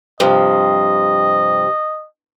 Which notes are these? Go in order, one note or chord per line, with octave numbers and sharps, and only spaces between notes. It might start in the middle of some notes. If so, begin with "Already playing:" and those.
G2 C3 F3 D#5